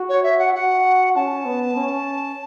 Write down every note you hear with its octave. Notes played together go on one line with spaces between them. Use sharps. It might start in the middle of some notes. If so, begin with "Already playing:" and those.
Already playing: F#4
C#5
E5
F#5
F#4 F#5
C#4 A5
B3
C#4